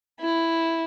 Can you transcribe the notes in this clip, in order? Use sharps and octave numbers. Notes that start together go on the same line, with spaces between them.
E4